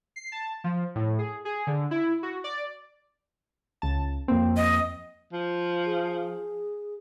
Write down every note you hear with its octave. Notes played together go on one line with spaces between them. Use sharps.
C7
A5
F3
A2
G#4
G#4
D3
E4
F#4
D5
C#2 A5
F2 A#3 C4
D#5
F3
G#4